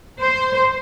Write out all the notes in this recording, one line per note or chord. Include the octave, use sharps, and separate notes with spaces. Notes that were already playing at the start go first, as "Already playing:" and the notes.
C5